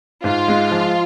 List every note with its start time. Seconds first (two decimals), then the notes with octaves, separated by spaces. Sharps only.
0.24 G#2 F4
0.48 G#3
0.71 F3